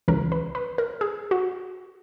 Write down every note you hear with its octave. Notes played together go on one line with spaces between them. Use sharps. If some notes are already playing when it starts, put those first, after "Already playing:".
C#2 C#3 E3 A#4
B4
B4
A#4
G#4
F#4